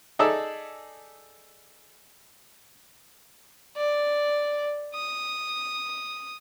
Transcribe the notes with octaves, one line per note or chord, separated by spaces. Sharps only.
D#4 G#4 A4 D5 E5
D5
D#6